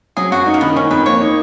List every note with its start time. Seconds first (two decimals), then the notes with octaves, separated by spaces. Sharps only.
0.17 F#3 G#4
0.32 F#2 F#4
0.46 D#4
0.54 A#3
0.61 D#3 B3
0.76 D#3 C#4
0.91 F2 B4
1.06 A#3 C#5
1.21 D#4